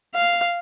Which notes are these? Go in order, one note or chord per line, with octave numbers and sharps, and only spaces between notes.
F5